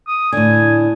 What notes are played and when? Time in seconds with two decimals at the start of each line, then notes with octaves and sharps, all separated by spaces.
0.08 D#6
0.32 A2 D3 G#5